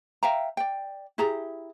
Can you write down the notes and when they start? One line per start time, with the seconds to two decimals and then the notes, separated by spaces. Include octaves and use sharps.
0.23 E5 F5 G5 A#5
0.57 D5 G5
1.18 E4 G4 G#4 A#5